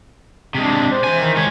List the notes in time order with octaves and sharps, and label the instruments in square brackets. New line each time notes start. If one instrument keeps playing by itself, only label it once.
[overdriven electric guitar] C3 G#3 [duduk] D4
[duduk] C5
[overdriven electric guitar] E3 G#5
[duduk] D#3
[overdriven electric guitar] G#3 C#5